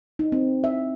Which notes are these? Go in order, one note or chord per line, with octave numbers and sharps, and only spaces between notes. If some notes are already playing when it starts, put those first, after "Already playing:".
D#4
C4
E5